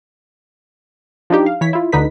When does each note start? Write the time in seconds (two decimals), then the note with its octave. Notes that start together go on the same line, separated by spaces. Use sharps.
1.30 F3 D4 D#4 G4
1.46 F5
1.61 E3 C#5 B6
1.73 E4 F4
1.92 D2 D3 D#4 B4 B6